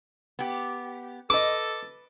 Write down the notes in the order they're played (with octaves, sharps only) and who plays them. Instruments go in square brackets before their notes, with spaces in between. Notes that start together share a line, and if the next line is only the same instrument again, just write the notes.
[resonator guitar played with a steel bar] B3 G4
[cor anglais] A4 [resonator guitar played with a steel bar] B4 D#5 [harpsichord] D6